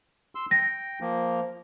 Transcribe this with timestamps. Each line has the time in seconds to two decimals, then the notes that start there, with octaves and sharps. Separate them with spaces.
0.35 C6 E6
0.51 G5 A#6
1.00 F3 A#3